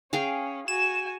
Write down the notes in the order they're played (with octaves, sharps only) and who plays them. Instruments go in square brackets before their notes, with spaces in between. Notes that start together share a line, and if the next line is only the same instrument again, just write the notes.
[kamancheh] C#4 [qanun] G#4 F5 G5
[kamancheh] F#4 G#5 [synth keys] E7